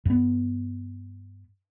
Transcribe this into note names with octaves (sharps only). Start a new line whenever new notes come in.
G2 B3